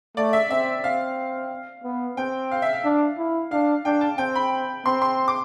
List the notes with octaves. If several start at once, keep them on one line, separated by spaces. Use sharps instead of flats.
A3 D5
E5
C4 E5
C4 F5
B3
C4 G5
F5
E5
F5
D4
E4
D4 F5
D4 G5
A5
C4 G5
B5
C4 C6
C6
D6